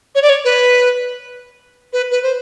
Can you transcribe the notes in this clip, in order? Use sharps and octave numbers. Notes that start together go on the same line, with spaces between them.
C#5
D5
C#5
B4
B4
B4
C5